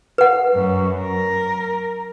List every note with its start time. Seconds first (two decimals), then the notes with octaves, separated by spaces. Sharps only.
0.18 B4 F#5
0.55 F#2
1.01 A#4